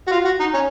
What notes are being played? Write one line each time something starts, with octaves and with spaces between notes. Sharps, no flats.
F#4
F4
F#4
D#4
C#4